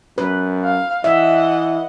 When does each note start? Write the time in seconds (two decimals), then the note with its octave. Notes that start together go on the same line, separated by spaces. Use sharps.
0.18 F#2 B4
0.65 F5
1.04 E3 D#5 E5 F#5